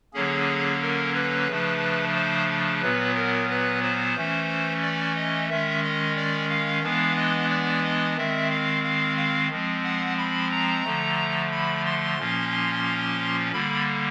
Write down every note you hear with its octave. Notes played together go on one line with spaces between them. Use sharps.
D3 F#3 A#3 C#4 G#4
A#4
B4
C#3 F3 A3 D4
C5
A#2 F#3 B3 B4
A#4
B4
C5
E3 A3 C#4
D5
D#5
D#3 G#3 C#4 E5
D#5
D5
F5
E3 G#3 B3 D4 F5
D#5
D5
D#5
D#3 G#3 C4 E5
F5
F5
F5
F3 G#3 C4
F#5
B5
A#5
D3 F3 A3
B5
C6
A#2 F3 A#3 C#4
D3 G3 A#3 B5